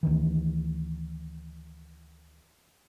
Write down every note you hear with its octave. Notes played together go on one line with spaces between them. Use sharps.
D2 D#3 E3